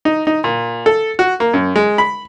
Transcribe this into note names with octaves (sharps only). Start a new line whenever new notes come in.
D#4
D#4
A#2
A4
F#4
A#3
F#2
G#3
B5